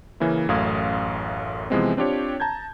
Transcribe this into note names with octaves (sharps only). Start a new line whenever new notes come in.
C#3 E3 A#3 C#4 E4
A1 F#2 A3 F5 D#6 G#6
C3 E3 F3 G#3 B3 C4
C4 D4 F4 G4 C#5
A5 A#5 G6 G#6